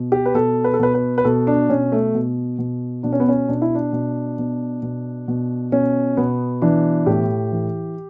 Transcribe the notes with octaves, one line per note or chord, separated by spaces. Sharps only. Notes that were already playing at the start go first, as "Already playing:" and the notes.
Already playing: B2
G4
B4
B2 A4
B4
A4
B2 B4
B4
B4
B2 A4
D4
B2 C#4
A3
B2
B2
B2 D4
C#4
B3
C#4
B2 D4
E4
D4
B2
B2
B2
B2
B2 C#4
B2 B3
E3 D4
A2 G4
E3